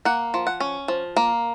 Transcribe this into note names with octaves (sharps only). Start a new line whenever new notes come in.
A#3 F#5
F3
F#5
C#4
F3
A#3